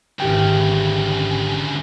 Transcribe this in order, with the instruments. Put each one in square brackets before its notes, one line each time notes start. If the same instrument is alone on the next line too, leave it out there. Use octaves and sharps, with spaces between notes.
[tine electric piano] G#1 G4 G5 [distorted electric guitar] D2 C#3